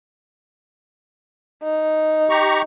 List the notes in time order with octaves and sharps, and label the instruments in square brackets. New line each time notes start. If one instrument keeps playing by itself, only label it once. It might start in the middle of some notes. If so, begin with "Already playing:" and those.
[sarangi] D#4
[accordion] G4 A#5 C#6